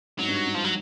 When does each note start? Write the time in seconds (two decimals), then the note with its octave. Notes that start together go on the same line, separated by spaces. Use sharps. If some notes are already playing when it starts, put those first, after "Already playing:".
0.19 G#2 F#3
0.28 G2
0.47 G2
0.55 F3
0.65 F#3